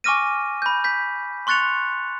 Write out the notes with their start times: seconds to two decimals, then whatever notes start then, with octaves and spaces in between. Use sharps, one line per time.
0.04 G#5 C#6 D6 F6 A#6 D#7
0.62 B5 G6
0.84 G6 B6
1.47 C6 C#6 F#6 A6 C#7 F7